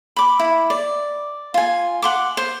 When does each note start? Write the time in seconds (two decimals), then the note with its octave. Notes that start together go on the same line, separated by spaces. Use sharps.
0.16 B5 D6
0.39 E4
0.70 D5
1.54 F4 G#5
2.02 F#5 C6 D6
2.37 C5